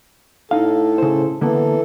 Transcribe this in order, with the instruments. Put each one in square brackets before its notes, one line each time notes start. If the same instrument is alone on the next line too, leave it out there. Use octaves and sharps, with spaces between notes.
[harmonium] A2 A4 [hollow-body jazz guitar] D#4 F5
[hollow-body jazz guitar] C#3 C5
[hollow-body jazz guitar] D3 A#3 B3 [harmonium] E3 A4